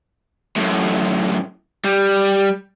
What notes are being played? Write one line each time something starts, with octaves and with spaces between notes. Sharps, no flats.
F#2 A2
G3